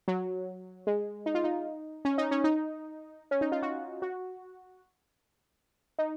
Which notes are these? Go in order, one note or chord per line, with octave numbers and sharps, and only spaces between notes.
F#3
G#3
D#4
F4
D#4
C#4
D#4
C#4
D#4
C#4
D#4
F4
F#4
F#4
D#4